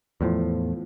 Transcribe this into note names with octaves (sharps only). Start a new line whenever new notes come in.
E2 A2 F3